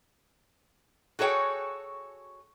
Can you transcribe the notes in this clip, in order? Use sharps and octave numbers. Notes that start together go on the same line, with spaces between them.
F#4 G#4 A4 C#5 G5